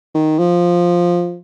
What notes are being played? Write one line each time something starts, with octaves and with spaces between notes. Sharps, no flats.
D#3
F3